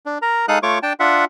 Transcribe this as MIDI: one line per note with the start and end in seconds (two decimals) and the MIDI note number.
0.06 0.18 62
0.22 0.46 70
0.22 0.46 82
0.48 0.59 56
0.48 0.59 63
0.48 0.59 69
0.48 0.59 77
0.48 0.59 87
0.48 0.59 90
0.63 0.79 57
0.63 0.79 65
0.63 0.79 73
0.63 0.79 85
0.63 0.79 86
0.83 0.93 62
0.83 0.93 79
0.83 0.93 81
1.00 1.25 62
1.00 1.25 65
1.00 1.25 76
1.00 1.25 78